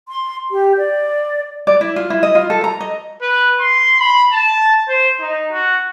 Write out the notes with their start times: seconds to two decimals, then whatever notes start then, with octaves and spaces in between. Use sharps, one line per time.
0.09 C6
0.51 G4
0.78 D5
1.67 D5
1.81 E4
1.96 F4
2.10 E4
2.23 D#5
2.35 F4
2.50 A4
2.64 A#5
2.81 D#5
3.22 B4
3.60 C6
4.00 B5
4.32 A5
4.88 C5
5.21 D#4
5.52 F#4